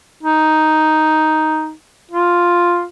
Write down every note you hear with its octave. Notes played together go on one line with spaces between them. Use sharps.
D#4
F4